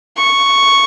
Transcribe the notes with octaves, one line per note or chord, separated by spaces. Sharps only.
C#6